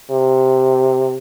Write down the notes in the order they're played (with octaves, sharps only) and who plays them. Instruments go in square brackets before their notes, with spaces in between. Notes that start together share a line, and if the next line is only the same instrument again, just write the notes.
[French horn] C3